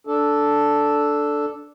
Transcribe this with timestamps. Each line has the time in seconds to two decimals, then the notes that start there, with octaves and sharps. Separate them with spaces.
0.07 D4 A4